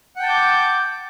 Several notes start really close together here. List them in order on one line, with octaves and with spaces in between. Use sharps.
F#5 G5 A5 G6 D6